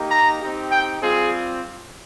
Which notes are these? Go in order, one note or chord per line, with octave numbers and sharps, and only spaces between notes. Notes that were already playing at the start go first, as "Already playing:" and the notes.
Already playing: A#3 D#4 G4
A#5
C4 D#4 G4
G5
G3 C4 F4 G#4